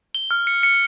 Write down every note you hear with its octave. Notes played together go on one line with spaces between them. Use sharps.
G7
F6
C#7
C#7